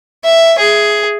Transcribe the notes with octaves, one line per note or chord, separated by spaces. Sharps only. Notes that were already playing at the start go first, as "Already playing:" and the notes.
E5
G#4